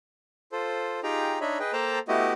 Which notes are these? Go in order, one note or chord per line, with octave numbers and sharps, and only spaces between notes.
F4 A4 C5
D#4 F4 G4 G#4 G5 A#5
D4 D#4 C#5 D#5 E5 B5
G#4 B4 D#5 G5
A#3 A4 C5 G5 A5 A#5
A3 B3 E4 F#4 G4 D#5